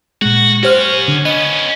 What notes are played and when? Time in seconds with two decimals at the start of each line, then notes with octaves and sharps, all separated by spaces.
0.22 A#2 G#3 F#4
0.63 C#4 F#4 G4 C5 F6
1.08 D3
1.25 B3 C#4 D#5